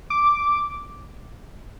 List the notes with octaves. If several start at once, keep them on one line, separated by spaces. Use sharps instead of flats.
D6